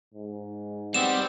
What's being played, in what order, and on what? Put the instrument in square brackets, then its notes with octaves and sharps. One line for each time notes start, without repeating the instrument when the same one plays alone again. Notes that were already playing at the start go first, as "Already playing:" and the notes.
[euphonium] G#2
[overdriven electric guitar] G3 [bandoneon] B3 C4 [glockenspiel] E7